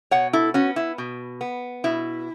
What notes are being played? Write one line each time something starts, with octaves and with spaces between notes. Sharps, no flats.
B2 C#5 F#5
E4 A4
B3 C#4 F#4
E4
B2
B3
B2 E4